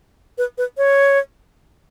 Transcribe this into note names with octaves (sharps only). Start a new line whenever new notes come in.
B4
B4
C#5